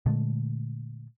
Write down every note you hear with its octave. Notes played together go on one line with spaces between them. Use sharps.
A#2 D3 G#3 A3